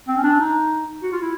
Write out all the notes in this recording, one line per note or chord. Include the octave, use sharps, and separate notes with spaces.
C4
C#4
D4
D#4
F#4
F4
E4